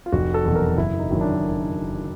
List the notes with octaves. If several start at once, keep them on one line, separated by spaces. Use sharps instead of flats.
F4
F1 F#4
A4
E2 B2 F#3
A#4
F#1 E4
D#4
F#2 D#3 F#3
D4